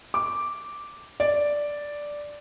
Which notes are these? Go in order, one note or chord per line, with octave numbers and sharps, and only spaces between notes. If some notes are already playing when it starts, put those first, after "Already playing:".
D6
D5